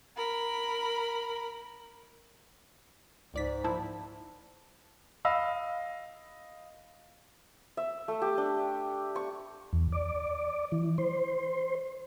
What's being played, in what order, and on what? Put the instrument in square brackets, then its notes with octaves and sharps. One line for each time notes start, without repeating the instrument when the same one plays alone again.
[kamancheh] A#4 B5
[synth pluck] C#2 D5 B6 [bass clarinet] G#2
[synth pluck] A#2 F3 E4 [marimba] A5
[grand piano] D#5 F5 B5 E6
[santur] E5
A3
G4
D4
C#6
[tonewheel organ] E2
D5
E3
C5